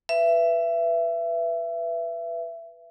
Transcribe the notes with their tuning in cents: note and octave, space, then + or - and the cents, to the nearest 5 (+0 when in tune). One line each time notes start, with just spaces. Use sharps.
B4 +0 E5 +25